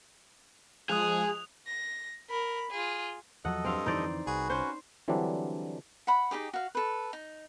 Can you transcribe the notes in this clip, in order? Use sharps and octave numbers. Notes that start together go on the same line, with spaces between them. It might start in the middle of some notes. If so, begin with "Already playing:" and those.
F3 G#3 G#4 D#6 F#6 F7
A#6
A#4 B5
F4 G#4
E2 F3 F#3 A4 D#5 F#5
G2 C4 F5
F2 D3 E3 D#4 C5 D5
C2 F#4 G#4 B4
C#4 C5
D3 E3 F#3 G3 C4 D4
F#5 B5
D#4 G4 G#4 D6
F#4 F5
A4 B4
D#4